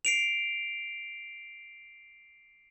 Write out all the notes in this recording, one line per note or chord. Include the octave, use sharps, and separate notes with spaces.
C7 D7 F7